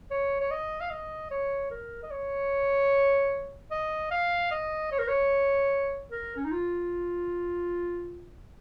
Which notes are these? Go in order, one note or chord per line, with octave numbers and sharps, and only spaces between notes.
C#5
C#5
D#5
F5
D#5
C#5
A#4
D#5
C#5
D#5
F5
D#5
C#5
A#4
C#5
A#4
C#4
D#4
F4